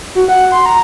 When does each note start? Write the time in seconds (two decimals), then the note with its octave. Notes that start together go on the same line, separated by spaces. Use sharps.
0.15 F#4
0.28 F#5
0.52 C6
0.66 A#5